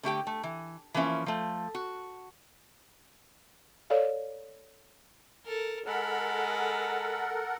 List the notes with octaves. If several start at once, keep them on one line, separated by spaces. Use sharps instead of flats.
D3 A3 G4 G5
A3
E3
E3 F3 A#3 C#4 E5
F3 A3
F#4
A4 C#5 D5 F5
A4 A#4
G#3 A4 A#4 F#5 B5